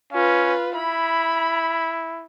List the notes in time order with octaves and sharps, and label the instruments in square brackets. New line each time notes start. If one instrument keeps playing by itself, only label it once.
[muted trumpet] C#4 [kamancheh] F4 B4
[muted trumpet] E4 [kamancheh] B5